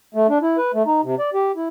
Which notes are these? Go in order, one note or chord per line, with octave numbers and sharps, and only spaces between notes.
A3
D4
E4
B4
A3
D#4
C3
D5
G4
E4